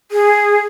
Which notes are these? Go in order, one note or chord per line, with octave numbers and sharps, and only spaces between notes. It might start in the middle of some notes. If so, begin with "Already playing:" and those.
G#4